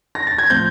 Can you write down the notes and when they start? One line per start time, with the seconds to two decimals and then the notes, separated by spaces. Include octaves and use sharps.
0.15 A#6
0.27 A6
0.38 G#6
0.50 A2 F3 A3 C4 G6